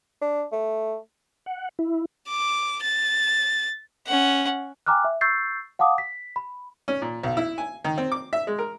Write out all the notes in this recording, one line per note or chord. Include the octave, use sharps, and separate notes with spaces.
D4
A3
F#5
E4
D6
A6
C#4 F#5
G5 G#5 A#5 D6 F6 F#6
E5
C#6 E6 G6 A6 C7
F5 F#5 A5 D6 D#6
B6
B5
C#4
A#2
B1
E4
G#5
D#3
C4
D6
E5
G#3
A#4